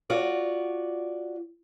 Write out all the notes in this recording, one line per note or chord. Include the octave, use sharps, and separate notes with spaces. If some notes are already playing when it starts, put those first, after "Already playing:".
F4 F#4 D5